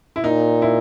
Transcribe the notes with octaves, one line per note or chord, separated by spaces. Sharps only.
E4
A#2 D#4
E4